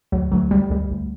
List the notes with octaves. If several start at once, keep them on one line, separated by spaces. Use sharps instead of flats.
D2 F#3
D2 F#3
D2 G3
D2 G3
D2